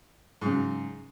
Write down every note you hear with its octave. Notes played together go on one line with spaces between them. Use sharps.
G#2 C#3 F#3